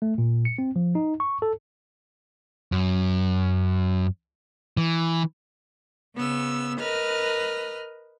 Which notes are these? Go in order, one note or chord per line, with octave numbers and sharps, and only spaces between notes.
A3
A#2
C#7
C4
F3
D#4
C#6
A4
F#2
E3
C#3 B3 E6
A#4 B4 D#5 F6